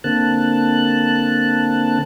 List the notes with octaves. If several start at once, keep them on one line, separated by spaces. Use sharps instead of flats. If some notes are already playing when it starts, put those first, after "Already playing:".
D3 A#3 C4 A5 F#6